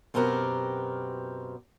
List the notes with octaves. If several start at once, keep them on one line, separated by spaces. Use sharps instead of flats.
F#2 B2 C4 G4 A#4 F#5